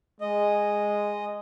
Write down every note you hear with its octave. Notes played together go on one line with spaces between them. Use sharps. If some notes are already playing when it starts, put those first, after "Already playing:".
G#3 D#5